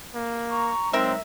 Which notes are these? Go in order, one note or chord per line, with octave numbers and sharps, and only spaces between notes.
A#3
A#5 C#6
F#3 G#3 C4 D#4 A#4 E5